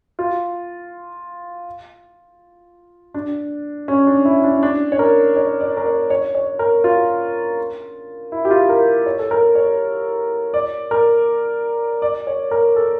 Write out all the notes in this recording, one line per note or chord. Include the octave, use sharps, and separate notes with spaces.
F4
D4
C#4
D4
E4
D4
D4
C#5
A#4
C#5
D5
A#4
C#5
C#5
C#5
A#4
F4
E4
G4
F4
A#4
C#5
A4
A#4
C#5
D5
A#4
D5
C#5
A#4
A4